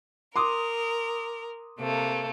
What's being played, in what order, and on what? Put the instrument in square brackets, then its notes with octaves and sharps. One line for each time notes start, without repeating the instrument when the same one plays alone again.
[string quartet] A#4 [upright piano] C6 D6 D#6
[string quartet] C3 A3 A#3